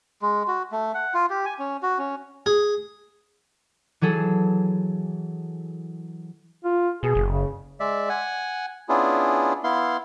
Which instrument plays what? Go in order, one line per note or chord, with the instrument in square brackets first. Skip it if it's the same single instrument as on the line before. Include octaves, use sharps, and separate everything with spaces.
[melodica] G#3
F#4
A3
F#5
F4
G4
G#5
C#4
F#4
C#4
[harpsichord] G#4
[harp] E3 F#3 G#4 A4
[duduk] F4
[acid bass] B2 [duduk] G#4
[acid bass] F#1
[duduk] C#3
[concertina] G#3 D5 E5
F#5 G#5
B3 C#4 D4 E4 F4 G#4
B3 E4 F5 C6